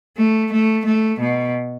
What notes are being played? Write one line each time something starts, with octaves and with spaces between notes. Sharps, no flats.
A3
A3
A3
B2